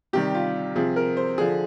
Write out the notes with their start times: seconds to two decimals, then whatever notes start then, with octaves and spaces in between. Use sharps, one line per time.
0.13 C3 D#3 G3 G4
0.35 F4
0.76 C3 F3 G#4
0.96 A#4
1.17 C5
1.38 D3 F3 G#4